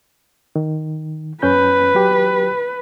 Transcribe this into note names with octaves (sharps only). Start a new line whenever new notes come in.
D#3
F#2 C#4 B4 G6
F#3 G4